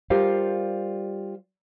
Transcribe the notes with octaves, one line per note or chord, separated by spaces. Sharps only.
G3 F4 G4 A#4 C5 F5